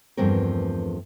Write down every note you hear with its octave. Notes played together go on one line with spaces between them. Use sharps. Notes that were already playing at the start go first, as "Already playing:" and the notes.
E2 G2 F3 A3 C4 A#4